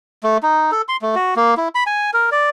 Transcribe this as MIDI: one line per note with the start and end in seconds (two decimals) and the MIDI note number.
0.23 0.38 57
0.43 0.71 63
0.72 0.82 69
0.88 0.97 84
1.02 1.15 57
1.15 1.34 66
1.36 1.54 58
1.57 1.68 64
1.75 1.84 83
1.87 2.11 80
2.13 2.30 70
2.32 2.50 74